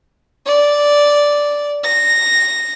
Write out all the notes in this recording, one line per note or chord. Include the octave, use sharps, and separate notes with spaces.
D5
A#6